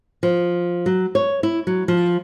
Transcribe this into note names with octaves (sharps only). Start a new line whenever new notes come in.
F3
F#3
C#5
E4
F#3
F3